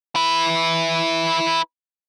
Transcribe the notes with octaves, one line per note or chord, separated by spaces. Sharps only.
E4 B4